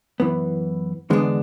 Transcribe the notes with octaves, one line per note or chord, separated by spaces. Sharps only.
F#2 E3 B3
E2 D3 G#3 B3 D4